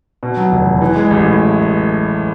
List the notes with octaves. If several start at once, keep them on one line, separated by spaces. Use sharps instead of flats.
B2
F#3
F1
E2
E3
G#3
A1
A2